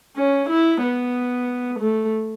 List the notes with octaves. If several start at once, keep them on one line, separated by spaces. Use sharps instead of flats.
C#4
E4
B3
A3